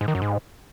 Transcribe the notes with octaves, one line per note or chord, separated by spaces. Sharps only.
G#2
D#3
F#2
G#2